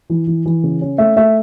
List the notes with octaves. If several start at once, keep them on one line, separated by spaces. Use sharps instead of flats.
E3
E3
E3
C#3
C#4
A3 E5
A3 E5